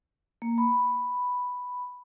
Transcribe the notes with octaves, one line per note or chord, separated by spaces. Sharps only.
A#3
B5